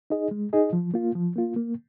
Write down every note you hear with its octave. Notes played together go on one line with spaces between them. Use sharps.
D#4 G#4 D#5
G#3
D#4 G#4 D#5
F3
A#3 F4
F3
A#3 F4
A#3